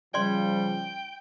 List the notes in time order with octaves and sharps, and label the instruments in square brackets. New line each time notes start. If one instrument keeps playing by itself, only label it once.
[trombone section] C#3 F3 [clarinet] G3 [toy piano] D5 C6 [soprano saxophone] G5